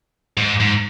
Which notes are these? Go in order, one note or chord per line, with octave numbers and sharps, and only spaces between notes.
G#2
G#2